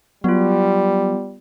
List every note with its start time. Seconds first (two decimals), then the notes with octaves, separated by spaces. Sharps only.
0.24 F#3 G3 B3 F4